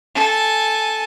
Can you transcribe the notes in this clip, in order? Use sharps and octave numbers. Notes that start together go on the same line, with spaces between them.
A4 G#5